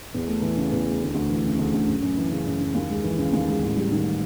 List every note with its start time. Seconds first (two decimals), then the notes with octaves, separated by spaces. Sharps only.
0.14 E2
0.27 A3
0.42 E3
0.57 C#3
0.72 E2
0.86 A3
1.01 D2
1.15 D2
1.30 E3
1.45 C#3
1.58 D2
1.74 D2
1.88 F#2
2.03 F#2
2.17 E3
2.31 C#3
2.46 F#2
2.60 F#2
2.75 D#2
2.89 G#3
3.04 E3
3.18 C#3
3.33 D#2
3.48 G#3
3.62 A1
3.76 G3
3.91 D#3